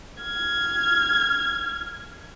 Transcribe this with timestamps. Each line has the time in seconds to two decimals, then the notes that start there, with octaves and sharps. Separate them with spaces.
0.22 F6 G#6